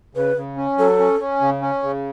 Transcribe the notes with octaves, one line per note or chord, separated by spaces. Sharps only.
C#3 B4
C#3
C#4
F#3 A4
C#4
C#4
C#3
C#4
C#3